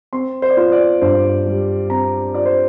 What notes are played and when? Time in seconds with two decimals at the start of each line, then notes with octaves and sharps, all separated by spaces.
0.13 C4 C6
0.42 C5
0.50 D5
0.57 F4 C5
0.72 D5
1.01 G2 C5
1.46 G3
1.90 C4 A#5
2.34 F4 D5
2.46 C5